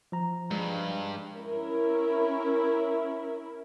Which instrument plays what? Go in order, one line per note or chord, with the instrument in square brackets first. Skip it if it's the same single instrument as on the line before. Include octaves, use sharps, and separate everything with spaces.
[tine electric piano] F3 A#5
[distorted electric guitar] G2 [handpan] G#3
[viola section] C#4 E4 A#4